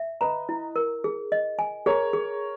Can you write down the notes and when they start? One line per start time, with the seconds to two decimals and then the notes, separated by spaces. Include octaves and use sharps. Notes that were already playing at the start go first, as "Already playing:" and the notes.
Already playing: E5
0.21 B4 D#5 A#5
0.49 E4
0.76 A#4
1.04 G#4
1.32 D#5
1.59 G#5
1.86 G#4 A#4 C#5
2.13 G#4